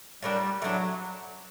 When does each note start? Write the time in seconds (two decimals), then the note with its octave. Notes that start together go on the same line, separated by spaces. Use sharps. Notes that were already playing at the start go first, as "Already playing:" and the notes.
0.22 A2 F#3 G3 A#3 D4
0.62 A2 E3 F#3 A3 D4